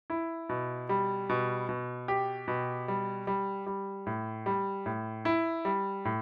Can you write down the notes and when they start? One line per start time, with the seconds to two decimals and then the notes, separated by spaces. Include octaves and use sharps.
0.10 E4
0.49 B2
0.89 G3
1.29 B2
1.69 B2
2.08 G4
2.48 B2
2.88 G3
3.27 G3
3.66 G3
4.07 A2
4.46 G3
4.86 A2
5.25 E4
5.65 G3
6.05 A2